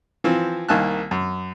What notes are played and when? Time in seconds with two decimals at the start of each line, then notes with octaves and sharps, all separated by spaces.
0.24 E3 F3 C4
0.68 C2 D#3 A#3 G#5 A5 F#6
1.11 F#2